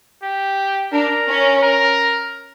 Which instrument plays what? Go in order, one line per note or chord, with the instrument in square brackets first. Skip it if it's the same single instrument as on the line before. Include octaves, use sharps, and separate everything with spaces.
[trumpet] G4
[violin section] D4 [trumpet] A#4
[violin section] C#4
[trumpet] A#4